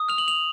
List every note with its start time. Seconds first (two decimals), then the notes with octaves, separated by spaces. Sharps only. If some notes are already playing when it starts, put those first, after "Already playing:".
Already playing: D#6
0.09 F6 F7
0.18 F#7
0.28 F7